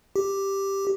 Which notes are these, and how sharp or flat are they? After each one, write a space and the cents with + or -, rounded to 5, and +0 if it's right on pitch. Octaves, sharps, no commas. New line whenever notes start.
G4 +0